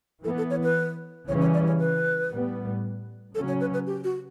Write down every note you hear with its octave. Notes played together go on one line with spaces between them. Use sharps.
E3 B3 A4
A4
C#5
B4
C#3 E3 G3 C#4 C#5
C#5
D5
C#5
B4
A2 G3 B3
C#3 F#3 C#4 A4
C#5
B4
B4
G4
F#4